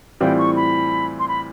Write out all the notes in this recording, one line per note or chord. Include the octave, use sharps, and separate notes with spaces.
A2 E3 G3 C4 F4 G5
C#6
B5
C6
B5